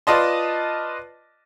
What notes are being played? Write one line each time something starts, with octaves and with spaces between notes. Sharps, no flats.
F4 B4 D5 D#5 A5 C6